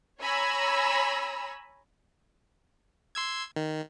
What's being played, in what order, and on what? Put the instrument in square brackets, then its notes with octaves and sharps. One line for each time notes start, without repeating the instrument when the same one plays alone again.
[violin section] C#5 G#5 A#5 B5 E6
[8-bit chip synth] C6 E6 G#6
D#3